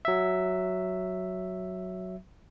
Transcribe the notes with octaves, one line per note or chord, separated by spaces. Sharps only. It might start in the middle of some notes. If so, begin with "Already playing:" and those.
F#3 E5